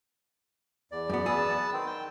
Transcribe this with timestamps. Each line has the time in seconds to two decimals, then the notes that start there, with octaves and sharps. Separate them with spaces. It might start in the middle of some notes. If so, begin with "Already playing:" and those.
0.92 E2 D5
1.10 F#2 B3
1.26 B3 G#4 A5 E6
1.72 D#3 C4
1.86 G5